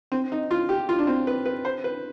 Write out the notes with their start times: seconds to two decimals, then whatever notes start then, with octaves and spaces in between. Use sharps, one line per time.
0.12 C4
0.32 D#4
0.51 F4
0.69 G4
0.89 F4
0.99 D4
1.07 C4
1.27 B4
1.46 B4
1.65 C5
1.84 B4